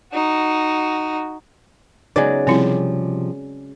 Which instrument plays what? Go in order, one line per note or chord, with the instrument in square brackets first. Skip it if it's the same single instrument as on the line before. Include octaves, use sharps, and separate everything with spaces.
[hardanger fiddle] D#4 F#4
[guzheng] C#3 F#3 G#3 [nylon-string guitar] B3 D#4 [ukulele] G#4 D5
[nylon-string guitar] C3 F3 G3 [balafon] C4 E4